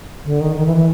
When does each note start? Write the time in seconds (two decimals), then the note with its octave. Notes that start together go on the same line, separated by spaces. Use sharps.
0.25 D3
0.41 D#3
0.56 D#3
0.66 E3
0.76 E3